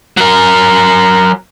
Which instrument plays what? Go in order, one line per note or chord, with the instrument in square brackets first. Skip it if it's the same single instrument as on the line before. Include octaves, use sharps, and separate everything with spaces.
[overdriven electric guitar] F#3 A#4